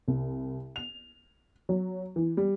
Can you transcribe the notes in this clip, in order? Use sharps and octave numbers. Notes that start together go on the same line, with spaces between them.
C2
F7
F#3
E3
G3